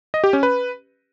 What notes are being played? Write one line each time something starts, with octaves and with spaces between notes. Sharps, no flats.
D#5
G4
C#4
B4